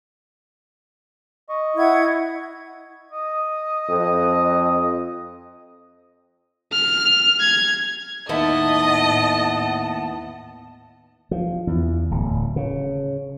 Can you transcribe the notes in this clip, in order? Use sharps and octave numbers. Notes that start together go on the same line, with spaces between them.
D#5 C#6
E4 F#5 G#6
D#5
F2
F6
G#6
D#2 A2 B3 E4 D#5 F#5 A5
F3
E2
D1
C#3